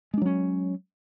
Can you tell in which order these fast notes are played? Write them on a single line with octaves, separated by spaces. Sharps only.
G#3 D4 F#3 C#4